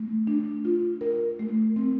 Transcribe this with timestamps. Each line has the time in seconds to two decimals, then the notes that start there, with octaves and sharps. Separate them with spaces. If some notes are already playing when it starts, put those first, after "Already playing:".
Already playing: A3
0.27 D4
0.65 F4
1.01 A#4
1.39 A3
1.76 C4